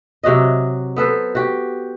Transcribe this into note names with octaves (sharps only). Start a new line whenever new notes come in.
C3 F#3 F#4 D#5
B3 A4 B4 C5
F#4 G4